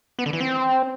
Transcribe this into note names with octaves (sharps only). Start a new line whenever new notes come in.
B3
D3
E3
C4